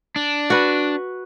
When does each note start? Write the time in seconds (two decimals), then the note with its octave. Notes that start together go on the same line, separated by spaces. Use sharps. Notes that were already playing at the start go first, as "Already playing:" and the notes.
0.16 D4
0.50 F#4 B4